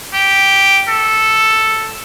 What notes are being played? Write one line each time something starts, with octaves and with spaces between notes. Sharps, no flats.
G4
A4